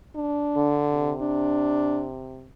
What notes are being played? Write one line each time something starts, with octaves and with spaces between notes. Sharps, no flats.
D4
D3
C3
D4